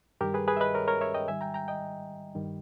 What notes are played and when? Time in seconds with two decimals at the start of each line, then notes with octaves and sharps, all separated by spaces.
0.21 G2 D#3 G3 G4 A#4
0.34 G#4 B4
0.48 G#4 B4
0.57 E5
0.60 B4 D#5
0.74 A#4 C#5
0.88 A#4 C#5
1.01 C#5 E5
1.14 D#5 G5
1.27 G#2 D#3 G3 E5 G#5
1.41 G5 A#5
1.54 G5 A#5
1.68 D#5 G5
2.35 G2 D#3 G3